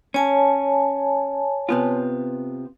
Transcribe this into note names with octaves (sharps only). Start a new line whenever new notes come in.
C#4 C#5 G#5 A5
C3 B3 F4